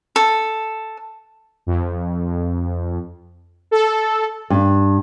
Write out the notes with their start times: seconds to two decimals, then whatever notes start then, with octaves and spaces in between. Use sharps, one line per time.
0.16 A4
1.67 F2
3.71 A4
4.50 G2